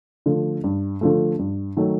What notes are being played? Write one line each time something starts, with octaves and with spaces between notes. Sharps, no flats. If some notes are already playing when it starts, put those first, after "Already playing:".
D3 F3 A3
G2
D3 F3 A3
G2
D#3 F#3 A3